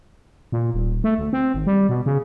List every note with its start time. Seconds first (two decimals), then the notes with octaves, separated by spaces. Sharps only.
0.52 A#2
0.74 D#1
1.04 A3
1.19 D2
1.33 C4
1.54 G#1
1.67 G3
1.89 B2
2.06 C#3